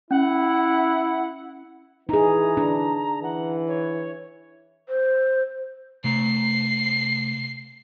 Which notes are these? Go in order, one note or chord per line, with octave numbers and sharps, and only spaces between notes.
C#4 E4 F#5
E3 D#4 G#4 A#5
D4
E3 F#5
C#5
C5
C3 A3 A#5 C7